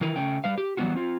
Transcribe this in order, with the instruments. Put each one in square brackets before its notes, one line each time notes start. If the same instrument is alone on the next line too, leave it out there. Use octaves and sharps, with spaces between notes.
[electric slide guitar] D#3 E3 E4 A#4 B4
C#3 A3 C#4 G5
G3 B4 F5
G4
E3 F#3 G3 B3 F4 F#4
C4 F4